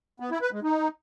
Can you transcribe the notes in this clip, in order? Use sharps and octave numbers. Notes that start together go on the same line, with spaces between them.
B3
E4
B4
G#3
D#4